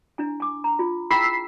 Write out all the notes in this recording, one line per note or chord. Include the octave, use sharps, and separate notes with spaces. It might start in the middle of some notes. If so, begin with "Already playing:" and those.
D4 E4 G#5
G#5 D6
A#5
F4
E4 G#4 G5 B5 E6 C7